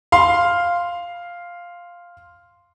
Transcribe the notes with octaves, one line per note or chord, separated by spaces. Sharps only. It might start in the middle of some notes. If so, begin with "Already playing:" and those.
F5 C6